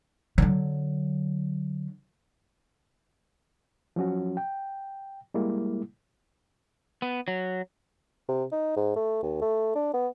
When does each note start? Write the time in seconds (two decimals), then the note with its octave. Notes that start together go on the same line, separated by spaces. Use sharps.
0.38 D3 F#3
3.96 F3 F#3 C#4 F#4
4.37 G5
5.34 G3 G#3 A#3 E4
7.02 B3
7.28 F#3
8.28 C3
8.52 D#4
8.76 G#2
8.96 A3
9.23 D#2
9.41 A3
9.75 D4
9.94 B3